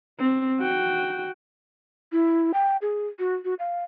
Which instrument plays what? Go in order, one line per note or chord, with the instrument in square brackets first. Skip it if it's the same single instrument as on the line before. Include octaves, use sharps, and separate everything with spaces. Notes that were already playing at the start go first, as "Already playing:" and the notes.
[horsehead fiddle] C4
F#4 G5
[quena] E4
G5
G#4
F#4
F#4
F5